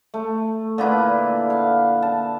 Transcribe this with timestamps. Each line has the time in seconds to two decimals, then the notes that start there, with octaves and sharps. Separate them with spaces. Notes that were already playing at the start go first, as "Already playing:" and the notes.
0.14 A3
0.78 A#2 D3 E4 B4
1.50 F5
2.02 A5